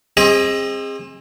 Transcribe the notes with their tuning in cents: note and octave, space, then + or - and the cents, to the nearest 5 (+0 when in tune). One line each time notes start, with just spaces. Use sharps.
C4 +25 G#4 -25 D#5 +10